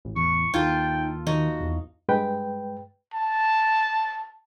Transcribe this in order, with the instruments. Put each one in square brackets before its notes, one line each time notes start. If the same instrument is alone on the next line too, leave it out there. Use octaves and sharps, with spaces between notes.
[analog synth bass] A1
[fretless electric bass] E2 [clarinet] C#6
[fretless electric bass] D#2 [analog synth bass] D#4 [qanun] F4 A4 [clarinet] G5
[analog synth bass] D#3 [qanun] D#4 [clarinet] F#4
[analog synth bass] E2
[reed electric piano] G2 G#3 B4 G5
[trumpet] A5